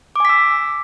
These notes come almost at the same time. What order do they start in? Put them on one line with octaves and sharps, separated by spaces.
D6 G#5 B6 E6